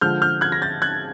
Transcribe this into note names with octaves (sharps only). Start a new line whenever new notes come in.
D3 F3 G#3 F6 G6
F6 G6
F#6 G#6
A#6
G6 A6
F#6 G#6